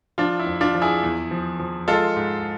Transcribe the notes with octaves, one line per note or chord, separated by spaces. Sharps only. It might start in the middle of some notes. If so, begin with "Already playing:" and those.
F3 D4 F4
E4
F2
D4 F4
F3
E4 G#4
E2
F3
F3
G#3 F4 A4
G#2